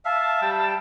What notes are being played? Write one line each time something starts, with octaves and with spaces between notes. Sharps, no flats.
E5 F5 A5
G3 G5